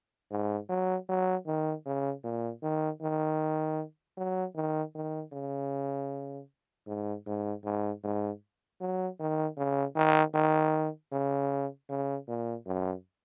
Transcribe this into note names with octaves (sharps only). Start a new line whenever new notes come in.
G#2
F#3
F#3
D#3
C#3
A#2
D#3
D#3
F#3
D#3
D#3
C#3
G#2
G#2
G#2
G#2
F#3
D#3
C#3
D#3
D#3
C#3
C#3
A#2
F#2